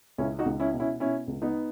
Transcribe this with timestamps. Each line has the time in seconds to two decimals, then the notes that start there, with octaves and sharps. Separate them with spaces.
0.18 C#2 C#4 E4
0.39 D#4 F#4
0.46 C#2
0.60 C#4 E4
0.73 B2
0.80 C#4 E4
1.00 B2 C#4 E4
1.28 C#2
1.42 B3 D#4